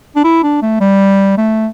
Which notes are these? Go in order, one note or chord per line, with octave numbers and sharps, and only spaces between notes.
D4
E4
D4
A3
G3
A3